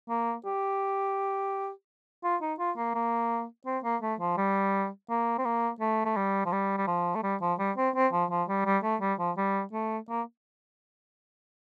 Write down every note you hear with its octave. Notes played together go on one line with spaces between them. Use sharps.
A#3
G4
F4
D#4
F4
A#3
A#3
C4
A#3
A3
F3
G3
A#3
C4
A#3
A3
A3
G3
F3
G3
G3
F3
A3
G3
F3
G3
C4
C4
F3
F3
G3
G3
A3
G3
F3
G3
A3
A#3